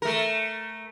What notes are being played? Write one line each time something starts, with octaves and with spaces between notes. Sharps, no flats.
A3 A#4